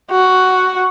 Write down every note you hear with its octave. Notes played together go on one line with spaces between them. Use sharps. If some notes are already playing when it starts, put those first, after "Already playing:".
F#4